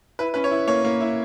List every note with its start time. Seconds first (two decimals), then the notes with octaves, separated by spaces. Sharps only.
0.19 E4 B4
0.34 C#4 B4
0.44 C#5
0.51 E4
0.67 A#3 C#5
0.85 A#3
1.01 E4